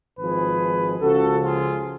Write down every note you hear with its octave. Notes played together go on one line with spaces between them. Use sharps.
G#1 G#2 F3 G#4 B4
C#2 C#3 F3 F#4 A4
F4 G#4